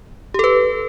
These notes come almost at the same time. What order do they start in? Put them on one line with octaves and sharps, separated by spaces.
G4 A4 B4